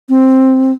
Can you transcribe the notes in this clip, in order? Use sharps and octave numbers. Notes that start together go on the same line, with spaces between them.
C4